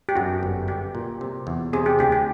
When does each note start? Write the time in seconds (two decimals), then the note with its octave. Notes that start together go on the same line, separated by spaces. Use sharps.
0.09 G4
0.16 F#2 F#4
0.43 G1
0.68 G3 G4
0.95 A#2
1.21 C3
1.47 E2
1.73 C3 G#4
1.86 G4
1.99 D2 G4
2.12 G4